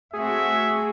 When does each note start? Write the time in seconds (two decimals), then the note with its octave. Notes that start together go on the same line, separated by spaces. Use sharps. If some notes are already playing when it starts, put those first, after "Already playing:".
0.14 A3 C4 F#4 G#4 E5